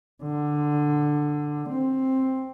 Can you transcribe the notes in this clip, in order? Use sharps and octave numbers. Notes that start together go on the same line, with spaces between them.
D3
C4